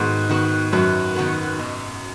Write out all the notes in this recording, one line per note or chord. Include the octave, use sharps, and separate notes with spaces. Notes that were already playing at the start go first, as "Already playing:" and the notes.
Already playing: G#2 D#3 B3 F#4 B4
D#3 B3 F#4 B4
F#2 D#3 B3 F#4 B4
D#3 B3 F#4 B4
B2